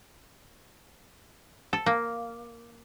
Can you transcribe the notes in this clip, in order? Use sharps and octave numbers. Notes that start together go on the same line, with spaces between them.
A4
A#3